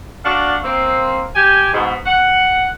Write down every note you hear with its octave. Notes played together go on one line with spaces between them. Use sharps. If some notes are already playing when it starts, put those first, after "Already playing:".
D4 F#4 D5 F5 F#5
A#3 C4
G4 G#5
G#2 B2
F#5